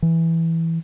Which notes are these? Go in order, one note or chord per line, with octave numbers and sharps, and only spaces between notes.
E3